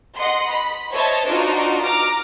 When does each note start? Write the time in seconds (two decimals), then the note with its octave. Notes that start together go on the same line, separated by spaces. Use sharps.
0.16 D#5 F#5 C6
0.49 B5
0.92 C5 C#5 D#5 E5 A5
1.26 D4 D#4 F4 F#4
1.81 A#5 D6 F6